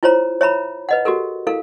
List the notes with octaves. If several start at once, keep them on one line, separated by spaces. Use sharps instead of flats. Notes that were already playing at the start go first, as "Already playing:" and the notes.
E4 F4 C5 C#5 A#5
C#5 E5 A#5 B5
B4 D#5 F#5
F#4 G4 A4 A#4
E4 A4 A#4 F5